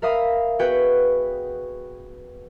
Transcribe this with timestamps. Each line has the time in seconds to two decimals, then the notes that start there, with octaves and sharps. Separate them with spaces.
0.02 A#4 E5 F5 B5 D#6
0.59 B3 F#4 G#4 B4 G5